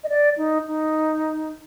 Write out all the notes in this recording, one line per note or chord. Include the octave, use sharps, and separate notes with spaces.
D#5
D5
D#4
D#4